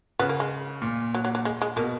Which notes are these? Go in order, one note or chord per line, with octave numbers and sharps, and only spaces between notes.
C#3 B3
A#3
G#3
A#2
F#3
F#3
F#3
G#3
G#3
B2 A#3